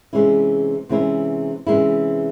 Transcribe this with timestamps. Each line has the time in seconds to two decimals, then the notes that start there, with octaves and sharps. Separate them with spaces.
0.13 C3 E3 G#3 C#4 E4
0.89 C3 E3 G#3 C#4 E4
1.67 C3 E3 G#3 C#4 E4